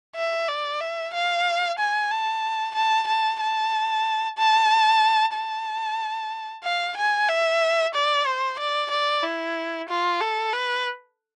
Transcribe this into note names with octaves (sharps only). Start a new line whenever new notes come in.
E5
D5
E5
F5
G#5
A5
A5
A5
A5
A5
A5
F5
G#5
E5
D5
C5
D5
D5
E4
F4
A4
B4